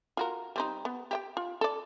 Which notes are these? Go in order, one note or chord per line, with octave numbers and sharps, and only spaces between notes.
F4 F#4 A#4
G3 C4 D#4
B3
G4 E5 G5
F4
A4 D5